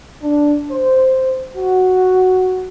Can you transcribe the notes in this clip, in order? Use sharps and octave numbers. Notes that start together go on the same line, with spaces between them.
D4
C5
F#4